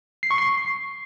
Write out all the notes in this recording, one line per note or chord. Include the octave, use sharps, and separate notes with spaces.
C7
C#6
C7